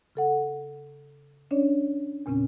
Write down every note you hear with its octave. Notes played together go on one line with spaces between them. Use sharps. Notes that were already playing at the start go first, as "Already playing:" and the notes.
C#3 A4 F#5
C#4 D4 C#5 D5
E2 A#2 C#3 C4 C#4